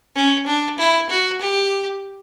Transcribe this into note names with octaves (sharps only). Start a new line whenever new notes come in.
C#4
D4
E4
F#4
G4